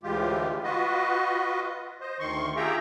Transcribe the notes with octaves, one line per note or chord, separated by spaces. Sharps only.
D2 A2 E3 G#3 F4 G4
F4 F#4 B4 D#5
C5 D#5
D2 D#3 C6 C#6
F4 G4 G#4 E5 G5 A#5